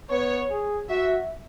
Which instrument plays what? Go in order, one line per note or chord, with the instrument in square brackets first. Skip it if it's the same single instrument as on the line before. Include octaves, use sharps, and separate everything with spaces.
[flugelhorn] B3 [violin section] C#5
[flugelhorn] G#4
[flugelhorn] F#4 [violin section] E5